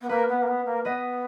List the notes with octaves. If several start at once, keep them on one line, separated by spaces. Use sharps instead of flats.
B3
A#3 B4
B3
A#3
B3
A#3
B3 B4 D#5